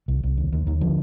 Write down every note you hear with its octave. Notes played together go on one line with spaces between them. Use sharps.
C2
C2
D#2
D#2
D#2 D#3
D3 F3